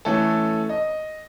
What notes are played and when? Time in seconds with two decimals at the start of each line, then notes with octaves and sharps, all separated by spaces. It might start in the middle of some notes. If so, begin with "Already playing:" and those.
0.05 E3 A3 C#4 A4
0.69 D#5